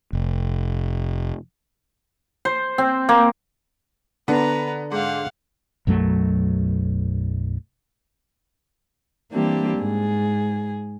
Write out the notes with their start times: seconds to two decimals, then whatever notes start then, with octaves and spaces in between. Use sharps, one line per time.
0.13 F1
2.45 C5
2.78 C4
3.09 A#3
4.28 D3 B3 D4 B4 A#5
4.92 G#2 F5 F#5
5.87 B1 F#2 F#3 A3
9.33 E3 G3 A#3 C4 D4 G4
9.78 G#2 G#4